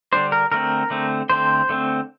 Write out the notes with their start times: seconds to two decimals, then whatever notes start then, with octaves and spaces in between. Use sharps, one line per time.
0.13 D3 G3 D4 C5
0.32 A#4
0.51 D3 A3 C4 A#4
0.90 D3 A3 C4
1.30 D3 A3 C4 C5
1.69 D3 A3 C4